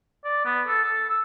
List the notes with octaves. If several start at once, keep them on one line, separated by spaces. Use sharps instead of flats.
D5
B3
A4
A4
E6